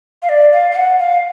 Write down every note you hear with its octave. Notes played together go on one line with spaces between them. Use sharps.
F5
D5
F5
F5
F#5
F5